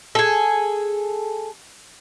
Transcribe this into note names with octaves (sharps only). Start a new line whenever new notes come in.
G#4 A4